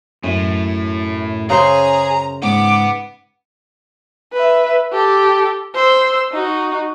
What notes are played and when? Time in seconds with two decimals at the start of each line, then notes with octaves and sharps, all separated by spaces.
0.23 F#2 A2
1.50 C#3 G#4 C5 A#5
2.42 G#2 B3 D6
4.33 B4 E5
4.93 G4 A4
5.75 C5 E6
6.32 D#4 F#4